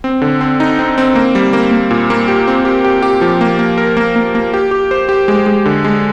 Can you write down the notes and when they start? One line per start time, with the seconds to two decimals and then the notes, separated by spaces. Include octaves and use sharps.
0.04 C4
0.22 D3
0.41 C4
0.60 D#4
0.79 C4
0.98 C4
1.15 A#3
1.35 G3
1.53 A#3
1.71 A#3
1.91 A#2
2.10 A#3
2.28 G4
2.47 C4
2.65 G4
2.84 G4
3.03 G4
3.21 F3
3.41 A#3
3.59 A#3
3.78 A#4
3.97 A#3
4.16 A#3
4.35 A#3
4.54 G4
4.71 G4
4.91 C5
5.09 G4
5.28 G#3
5.46 G#3
5.66 D3
5.85 G#3